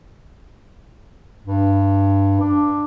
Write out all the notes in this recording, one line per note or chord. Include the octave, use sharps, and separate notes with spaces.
G2
D4